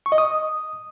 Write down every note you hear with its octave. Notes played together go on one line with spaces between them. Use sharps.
C#6
D#5
D#6